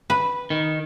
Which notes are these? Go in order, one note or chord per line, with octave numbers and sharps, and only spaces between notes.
B4
D#3